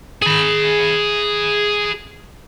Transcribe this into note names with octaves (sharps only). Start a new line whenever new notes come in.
G#4 B5